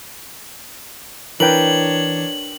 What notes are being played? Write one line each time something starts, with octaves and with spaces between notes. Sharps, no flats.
E3 D4 A#4 B4 C#5 G5 F#7